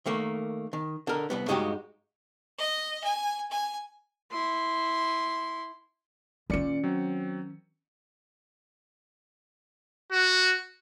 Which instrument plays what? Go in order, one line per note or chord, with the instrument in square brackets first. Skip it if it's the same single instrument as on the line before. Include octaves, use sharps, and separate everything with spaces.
[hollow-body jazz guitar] D#3 A3 A#3
D#3
D3 A#4
C2 G3 B3
G2 G#3 D#4 F#4 G4
[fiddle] D#5
G#5
G#5
[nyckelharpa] E4 C6
[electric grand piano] A#2 D5 C#7 [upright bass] D#3 C#4
[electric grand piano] F#3 C4
[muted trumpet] F#4